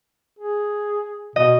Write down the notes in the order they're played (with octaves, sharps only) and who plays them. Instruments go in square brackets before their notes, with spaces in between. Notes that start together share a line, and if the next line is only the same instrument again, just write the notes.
[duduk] G#4
[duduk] B2 [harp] D#5